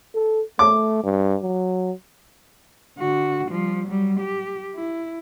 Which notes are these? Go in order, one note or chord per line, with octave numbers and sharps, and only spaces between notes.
A4
A3 D6
G2
F#3
D3 F#4
F3 G3
F#3 G3
G4
E4